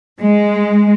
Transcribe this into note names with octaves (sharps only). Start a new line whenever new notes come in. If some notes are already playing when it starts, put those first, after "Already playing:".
G#3